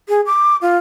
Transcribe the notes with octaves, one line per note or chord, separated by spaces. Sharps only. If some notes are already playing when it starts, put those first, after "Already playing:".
G#4
D6
F4